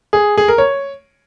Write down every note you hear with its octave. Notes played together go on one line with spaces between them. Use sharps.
G#4
G#4
A#4
C#5